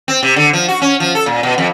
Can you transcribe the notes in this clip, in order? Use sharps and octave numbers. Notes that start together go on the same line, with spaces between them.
C4
C3
D3
F3
F#4
C#4
F3
A4
A#2
B2
F2